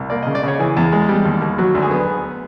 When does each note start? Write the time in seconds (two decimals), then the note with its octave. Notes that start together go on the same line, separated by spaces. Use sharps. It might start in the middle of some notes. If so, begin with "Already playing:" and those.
Already playing: C2
0.10 A#3 D5
0.23 D#5
0.27 C#3
0.35 D5
0.43 C#3 C#5
0.59 E3 G#4
0.77 E2
0.92 G#3
1.09 G3
1.25 D#2
1.42 D#2
1.58 F#3 F#4
1.75 D2
1.82 G#4
1.91 B3